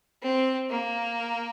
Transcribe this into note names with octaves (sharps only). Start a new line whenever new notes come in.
C4
A#3